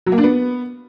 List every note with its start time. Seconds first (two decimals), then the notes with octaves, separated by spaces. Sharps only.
0.06 F#3
0.12 A#3
0.18 D4
0.24 B3